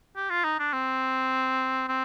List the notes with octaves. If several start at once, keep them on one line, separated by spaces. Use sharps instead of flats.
G4
F4
D#4
D4
C4
C4